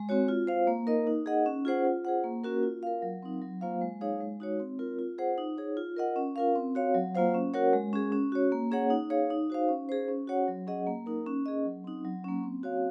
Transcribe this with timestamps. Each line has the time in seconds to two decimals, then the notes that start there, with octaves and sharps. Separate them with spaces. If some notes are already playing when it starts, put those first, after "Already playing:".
Already playing: G#3
0.09 C4 F#4 C#5
0.28 F4
0.47 C5 F5
0.67 A#3
0.87 D#4 A#4 D#5
1.07 D#4
1.26 G#4 D#5 F#5
1.46 C#4
1.65 F4 G#4 C5 F#5
1.85 F4
2.05 G#4 C5 F#5
2.24 A#3
2.44 C#4 F#4 A#4
2.63 F4
2.83 A#4 F5
3.02 F#3
3.22 C4 D#4
3.42 F#3
3.61 A#3 F4 C5 F5
3.81 G#3
4.01 D#4 G#4 C#5 F5
4.21 G#3
4.40 D#4 F#4 C#5
4.60 C4
4.79 F4 A#4
4.99 F4
5.18 G#4 C5 F#5
5.38 D#4
5.58 G#4 C#5
5.77 F4
5.97 A#4 D#5 F#5
6.16 C#4
6.36 F4 A#4 F5
6.55 C4
6.75 F#4 C#5 F5
6.95 F#3
7.15 A#3 F4 C5 F5
7.34 C#4
7.54 F#4 A#4 C#5 F#5
7.73 G#3
7.93 C#4 G#4
8.12 C#4
8.32 F#4 C#5
8.52 A#3
8.71 C#4 G#4 C#5 F#5
8.90 D#4
9.10 G#4 C#5 F5
9.30 D#4
9.50 F#4 C5 F5
9.69 C#4
9.89 G#4 C5
10.08 C#4
10.27 F#4 C#5 F#5
10.48 F#3
10.67 C#4 G#4 D#5 F#5
10.87 A#3
11.06 D#4 A#4
11.27 C#4
11.46 G#4 D#5
11.65 F#3
11.84 C4 D#4
12.05 F#3
12.24 A#3 C#4
12.43 C4
12.63 F#4 C#5 F5